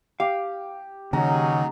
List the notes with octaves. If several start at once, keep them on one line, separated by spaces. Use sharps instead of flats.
G4 F5
D#2 C#3 F#3 C#4 D#4 A#5